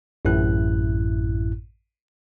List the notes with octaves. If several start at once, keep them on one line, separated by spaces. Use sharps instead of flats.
A1 F#2 A2 E4 F#6